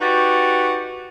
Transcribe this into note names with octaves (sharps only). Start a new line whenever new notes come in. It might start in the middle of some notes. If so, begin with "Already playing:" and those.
D#4 F#4 G4 B4 D5